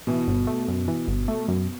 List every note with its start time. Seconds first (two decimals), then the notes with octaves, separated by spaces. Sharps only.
0.07 B2 E3
0.28 G1
0.47 A3
0.68 F#2
0.88 E3
1.08 G1
1.28 A3
1.48 F#2